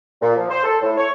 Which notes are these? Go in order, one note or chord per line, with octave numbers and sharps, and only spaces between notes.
A#2
F3
C5
A4
A2
C#5